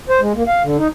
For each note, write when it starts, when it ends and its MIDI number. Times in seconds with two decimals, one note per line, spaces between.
0.09 0.20 72
0.21 0.32 56
0.34 0.43 58
0.47 0.62 77
0.63 0.77 50
0.78 0.88 63